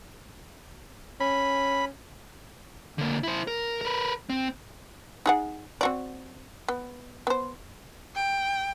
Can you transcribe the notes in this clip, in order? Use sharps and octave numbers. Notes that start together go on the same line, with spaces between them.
C#4 B5
D3 A#3
E4 C5
A#4
A#4 B4
C4
D#4 G#4 F#5
C4 F#4 D5
B3
B3 C5
G5